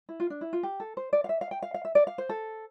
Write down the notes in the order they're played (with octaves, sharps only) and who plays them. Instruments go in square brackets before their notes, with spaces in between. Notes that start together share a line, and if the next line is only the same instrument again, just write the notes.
[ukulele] E4
F4
D4
E4
F4
G4
A4
C5
D5
F5
E5
F5
G5
F5
F5
E5
D5
F5
C5
A4